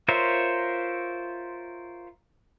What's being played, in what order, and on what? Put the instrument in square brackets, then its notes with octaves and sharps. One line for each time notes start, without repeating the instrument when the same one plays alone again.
[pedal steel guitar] F4 A#4 C5 C#5 E5